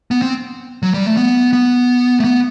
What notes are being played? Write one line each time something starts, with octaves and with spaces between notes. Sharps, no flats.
B3
C4
F#3
G3
A3
B3
B3
A3
B3